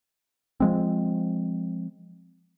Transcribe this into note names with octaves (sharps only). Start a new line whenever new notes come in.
F3 G#3 C4